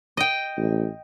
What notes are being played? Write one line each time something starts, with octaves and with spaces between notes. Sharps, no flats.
D#5 G5
A1